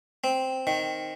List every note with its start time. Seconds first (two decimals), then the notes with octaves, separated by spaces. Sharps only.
0.24 C4
0.67 D#3